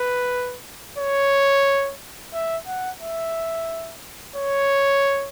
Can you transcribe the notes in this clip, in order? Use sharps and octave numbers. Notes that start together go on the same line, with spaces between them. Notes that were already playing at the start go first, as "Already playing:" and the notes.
Already playing: B4
C#5
E5
F#5
E5
C#5